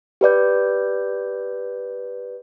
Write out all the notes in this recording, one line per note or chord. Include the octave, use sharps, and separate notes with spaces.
G4 B4 D5 G6